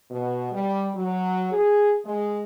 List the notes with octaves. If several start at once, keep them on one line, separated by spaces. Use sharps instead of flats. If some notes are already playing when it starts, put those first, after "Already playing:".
B2
G3
F#3
G#4
G#3